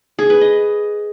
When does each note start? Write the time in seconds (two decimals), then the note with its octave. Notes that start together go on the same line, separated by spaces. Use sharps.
0.19 G#4
0.30 B4
0.41 D#5